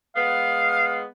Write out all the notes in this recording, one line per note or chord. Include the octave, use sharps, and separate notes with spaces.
G#3 B3 F5